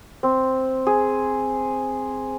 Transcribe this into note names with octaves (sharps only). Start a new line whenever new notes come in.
C4
G#4